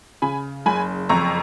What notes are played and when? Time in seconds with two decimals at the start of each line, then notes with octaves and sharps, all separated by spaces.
0.22 C#3 G#5 B5
0.66 F#1 G#5 B5
1.09 F2 A#5 C#6